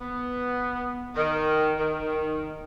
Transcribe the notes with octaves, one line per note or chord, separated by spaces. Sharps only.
B3
D#3
D#3